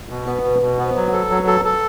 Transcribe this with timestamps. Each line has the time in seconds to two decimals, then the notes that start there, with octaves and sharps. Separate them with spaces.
0.09 B2
0.26 B3 B4
0.44 B2
0.62 B2
0.79 B3 C5
0.96 F#3 B4
1.13 A4
1.30 F#3
1.47 A4
1.65 A4